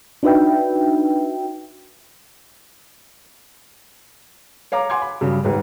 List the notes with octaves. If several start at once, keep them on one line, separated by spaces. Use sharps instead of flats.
D4 D#4 F#4 B4 E5 G5
C#5 F5 A#5 D6
F#5 G#5 C6 D6 G#6
B5
G2 C#3 F#3
D#2 G#2 B4